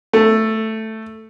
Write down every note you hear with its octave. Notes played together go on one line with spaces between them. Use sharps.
A3